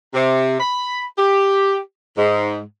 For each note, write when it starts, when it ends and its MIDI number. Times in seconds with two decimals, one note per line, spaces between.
0.14 0.58 48
0.60 1.04 83
1.18 1.78 67
2.17 2.59 44